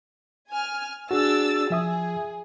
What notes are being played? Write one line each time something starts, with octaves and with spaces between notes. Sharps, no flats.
G#5 F6
D4 F#4 G#4 E6 A6
F3 G#4 E5 D#6